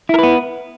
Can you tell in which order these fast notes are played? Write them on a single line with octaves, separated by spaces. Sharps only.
E4 A#4 B4 B3